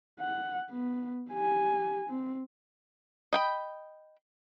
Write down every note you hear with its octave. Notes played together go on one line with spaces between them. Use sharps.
F#5
B3
G4 G#5
C4
D#5 G5 B5